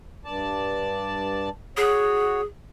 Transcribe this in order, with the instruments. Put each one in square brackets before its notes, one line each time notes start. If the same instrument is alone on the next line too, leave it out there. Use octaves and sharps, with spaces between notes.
[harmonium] G2 D5 A5
[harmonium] F#4 C#5 [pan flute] G#4